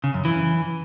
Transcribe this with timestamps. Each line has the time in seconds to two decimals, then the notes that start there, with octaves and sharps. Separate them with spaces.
0.04 C#3
0.14 F#2
0.25 E3